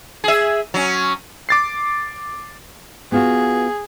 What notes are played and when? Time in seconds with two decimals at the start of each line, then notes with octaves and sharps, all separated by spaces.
0.24 G#4 E5
0.74 F#3 C#4
1.49 D6 A6 C7
3.12 B3 F4 F#4 G#4